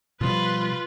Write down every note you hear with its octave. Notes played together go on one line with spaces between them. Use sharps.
B2 F3 G3 F4 B4